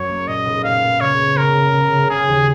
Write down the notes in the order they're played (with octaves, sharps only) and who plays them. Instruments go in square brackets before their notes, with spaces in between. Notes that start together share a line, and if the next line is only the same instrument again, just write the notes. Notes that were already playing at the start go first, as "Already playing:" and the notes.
Already playing: [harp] F#2 C#4 [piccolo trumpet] C#5
[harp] A#3
[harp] A#2 [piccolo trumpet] D#5
[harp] B1
[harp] A#2 [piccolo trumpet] F5
[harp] B3
[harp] C#3 [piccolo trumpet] C#5
[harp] B3
[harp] C#3 [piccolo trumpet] A#4
[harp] C#3
C#3
C#3
[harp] C#3 [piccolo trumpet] G#4
[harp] D#2